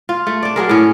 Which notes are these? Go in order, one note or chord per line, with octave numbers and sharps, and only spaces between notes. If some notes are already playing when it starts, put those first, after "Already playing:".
F4
A3
D4 D5
F#3 G#4 A#4
A2 C#4